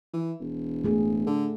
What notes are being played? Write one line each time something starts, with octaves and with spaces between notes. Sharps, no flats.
E3
E1
A3 G#4
D3